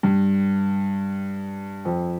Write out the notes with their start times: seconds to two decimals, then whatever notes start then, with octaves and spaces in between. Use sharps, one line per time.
0.03 G2
1.85 F2